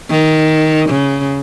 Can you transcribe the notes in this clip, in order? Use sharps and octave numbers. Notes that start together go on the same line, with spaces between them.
D#3
C#3